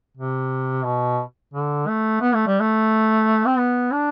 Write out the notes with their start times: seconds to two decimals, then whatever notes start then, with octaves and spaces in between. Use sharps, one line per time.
0.17 C3
0.85 B2
1.54 D3
1.88 A3
2.21 B3
2.34 A3
2.47 G3
2.60 A3
3.47 C4
3.58 B3
3.92 D4